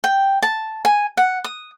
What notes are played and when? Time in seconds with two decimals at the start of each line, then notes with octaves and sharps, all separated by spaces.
0.04 G5
0.42 A5
0.85 G#5
1.17 F#5
1.44 D#6